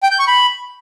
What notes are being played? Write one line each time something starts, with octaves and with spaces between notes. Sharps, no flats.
G5
G6
C#6
B5